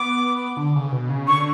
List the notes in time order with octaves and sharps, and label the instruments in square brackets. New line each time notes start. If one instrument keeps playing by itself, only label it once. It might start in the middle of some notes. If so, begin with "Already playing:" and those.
Already playing: [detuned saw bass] B3 [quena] D6
[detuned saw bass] D3
C#3
B2
C#3
[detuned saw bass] D3 [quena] C#6